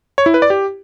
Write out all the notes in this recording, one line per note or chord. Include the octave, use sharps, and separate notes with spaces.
C#5
E4
B4
D5
G4